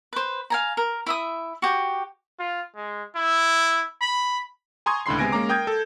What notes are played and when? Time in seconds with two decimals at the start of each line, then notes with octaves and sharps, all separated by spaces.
0.13 B4 C5
0.50 F5 G#5 A#5
0.77 A#4
1.06 E4 E5 D#6
1.62 F#4 G4
2.40 F4
2.76 G#3
3.16 E4
4.01 B5
4.86 G#5 A#5 C6 C#6 D#6 G#6
5.06 C#2 A2 D3 B5 C6 C7
5.19 C3 G#3 B3 G#5 A#6 D7
5.32 G#3 A#3 C#4 A#5 D6
5.49 A#4 G5 D#6 G6 G#6
5.67 A4